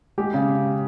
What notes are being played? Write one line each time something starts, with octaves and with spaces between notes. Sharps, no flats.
G#3 G4
C#3